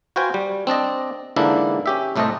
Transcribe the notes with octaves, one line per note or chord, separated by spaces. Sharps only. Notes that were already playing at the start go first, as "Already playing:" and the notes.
F#4 B4 C5 F5 G5 G#5
G3
C4 D4 D5 D#5
G#2 D3 E3 A#3 D4 E4
C#4 G4 E5
C2 A2 A3 A4 C5 D#5